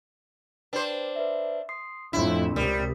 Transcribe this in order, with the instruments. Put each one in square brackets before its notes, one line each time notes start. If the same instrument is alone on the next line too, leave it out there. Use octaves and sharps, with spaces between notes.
[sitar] D4 C5 [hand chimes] B4 G5
[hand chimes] B4 D5 E5
C6 D#6 C7
[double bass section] F2 A2 [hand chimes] D4 C6 [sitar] E4
[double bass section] C#2 C3 [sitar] G3 [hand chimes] A#4 D#6